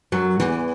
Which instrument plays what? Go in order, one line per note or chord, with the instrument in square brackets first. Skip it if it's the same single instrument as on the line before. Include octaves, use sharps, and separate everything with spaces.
[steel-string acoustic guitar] F#2 F#3
E2 E3